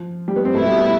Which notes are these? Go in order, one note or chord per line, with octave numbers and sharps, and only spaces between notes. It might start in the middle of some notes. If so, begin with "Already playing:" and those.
Already playing: F3
G3
B3
C4
B2 A3 B3 E4
G3
A3